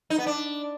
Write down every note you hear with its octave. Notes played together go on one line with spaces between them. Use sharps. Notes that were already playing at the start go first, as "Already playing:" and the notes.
D#4
B3
D4